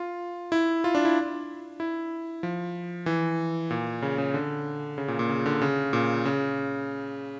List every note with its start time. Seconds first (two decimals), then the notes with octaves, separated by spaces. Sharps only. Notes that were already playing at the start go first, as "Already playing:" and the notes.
Already playing: F4
0.52 E4
0.84 F4
0.95 D4
1.05 E4
1.80 E4
2.43 F3
3.06 E3
3.70 A#2
4.02 C#3
4.18 C#3
4.34 D3
4.98 C#3
5.08 A#2
5.19 A#2
5.29 C#3
5.46 D3
5.62 C#3
5.93 A#2
6.25 C#3